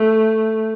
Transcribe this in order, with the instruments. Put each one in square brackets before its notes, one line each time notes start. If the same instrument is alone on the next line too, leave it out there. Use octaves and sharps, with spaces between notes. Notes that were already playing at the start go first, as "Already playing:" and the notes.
Already playing: [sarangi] A3